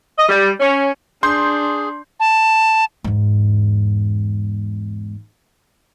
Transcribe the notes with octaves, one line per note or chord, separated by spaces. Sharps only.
D#5
G3
C#4
D4 G#4 C6 G6
A5
E2 G#2